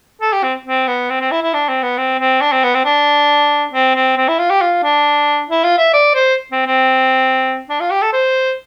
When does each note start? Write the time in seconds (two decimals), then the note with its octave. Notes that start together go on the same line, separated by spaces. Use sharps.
0.22 A4
0.33 G4
0.44 C4
0.66 C4
0.88 B3
1.10 C4
1.20 C4
1.32 E4
1.42 E4
1.54 D4
1.69 C4
1.83 B3
1.98 C4
2.20 C4
2.41 D4
2.52 C4
2.64 B3
2.74 C4
2.85 D4
3.73 C4
3.95 C4
4.17 C4
4.28 E4
4.39 F4
4.50 G4
4.61 F4
4.84 D4
5.49 E4
5.64 F4
5.78 E5
5.93 D5
6.15 C5
6.52 C4
6.67 C4
7.69 D4
7.80 F4
7.91 G4
8.02 A4
8.13 C5